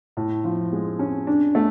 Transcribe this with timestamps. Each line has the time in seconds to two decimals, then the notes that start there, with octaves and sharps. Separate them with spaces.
0.17 A2
0.44 F3
0.73 G#3
0.99 C#4
1.27 D4
1.55 A3